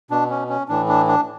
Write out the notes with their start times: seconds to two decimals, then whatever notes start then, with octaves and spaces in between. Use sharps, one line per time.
0.11 B2 D4
0.30 C#4
0.50 C#4
0.69 A2 E3 D4
0.88 D4
1.07 D4